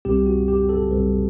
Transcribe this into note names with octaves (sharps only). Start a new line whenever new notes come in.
C2 B2 G3 C4 G4
F#4
G4
A4
C2 B2 G3 C4 B4